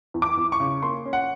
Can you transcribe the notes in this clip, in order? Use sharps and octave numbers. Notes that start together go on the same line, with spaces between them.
E2
D6
E2
C#6
C#3
A#3 C6
C#4
F#5